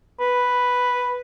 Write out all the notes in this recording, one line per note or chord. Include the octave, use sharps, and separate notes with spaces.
B4